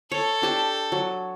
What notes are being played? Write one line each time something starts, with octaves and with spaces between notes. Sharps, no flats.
A4 C#5
D4 G4 A5
F#3